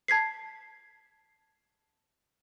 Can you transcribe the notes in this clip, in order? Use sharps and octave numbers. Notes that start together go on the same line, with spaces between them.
A5 G#6 B6 C7